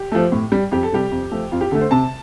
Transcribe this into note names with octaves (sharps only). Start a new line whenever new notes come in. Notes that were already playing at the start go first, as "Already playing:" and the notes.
Already playing: G4
F3 A3
A2
G3
F2 G4
A4
C3 G3 G4
F2
F3 A3
F2 F4
G4
D3 A3 A4
C5
C3 A5